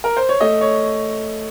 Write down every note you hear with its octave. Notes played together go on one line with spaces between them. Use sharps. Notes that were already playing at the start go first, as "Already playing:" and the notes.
A#4
C5
C#5
A3 D#5
C#5